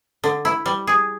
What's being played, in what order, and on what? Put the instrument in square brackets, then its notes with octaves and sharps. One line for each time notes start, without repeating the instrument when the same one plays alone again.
[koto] D3
E4
G3
G#4